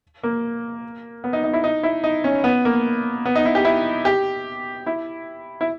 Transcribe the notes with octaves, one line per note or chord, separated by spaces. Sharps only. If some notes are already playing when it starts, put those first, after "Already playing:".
A#3
B3
D#4
D#4
E4
D#4
E4
D#4
C#4
B3
A#3
B3
D#4
E4
G4
E4
G4
E4
E4